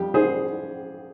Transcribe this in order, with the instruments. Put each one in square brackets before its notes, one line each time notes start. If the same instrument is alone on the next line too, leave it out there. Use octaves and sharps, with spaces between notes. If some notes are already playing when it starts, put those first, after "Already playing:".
Already playing: [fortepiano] F2 G3 G4
G#4 C5